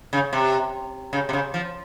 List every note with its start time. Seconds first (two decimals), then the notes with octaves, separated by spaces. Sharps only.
0.13 C#3
0.33 C3
1.13 C#3
1.29 C3
1.33 C#3
1.54 F3